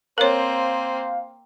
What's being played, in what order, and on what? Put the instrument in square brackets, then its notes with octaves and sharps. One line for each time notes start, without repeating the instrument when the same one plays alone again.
[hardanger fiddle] A#3 C4 [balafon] A#4 C#5 [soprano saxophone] C5 [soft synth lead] F5